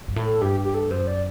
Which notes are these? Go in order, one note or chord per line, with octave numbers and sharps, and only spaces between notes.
G2
A2
A4
G2 G4
G4
A4
F#2 C5
D5